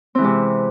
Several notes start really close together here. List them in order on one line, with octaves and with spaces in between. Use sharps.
C4 E3 G#3 C3